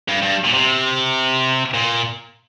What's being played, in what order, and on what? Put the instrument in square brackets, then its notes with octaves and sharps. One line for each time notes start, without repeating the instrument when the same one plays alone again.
[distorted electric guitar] G2
G2
A#2
C3
A#2